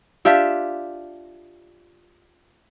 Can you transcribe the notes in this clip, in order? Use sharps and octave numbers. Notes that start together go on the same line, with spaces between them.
D4 F4 G4 E5